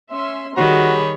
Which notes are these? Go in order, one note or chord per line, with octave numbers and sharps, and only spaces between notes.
C#4 E5 C6
D#3 G3 F#4 G#4 C#5 B5